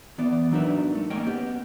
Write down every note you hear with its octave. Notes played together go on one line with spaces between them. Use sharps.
E3 B3 D5
F#3 D4 D#4 A#4 B4 E5
A3
A#3 C#4 D#5 G5
B3 G4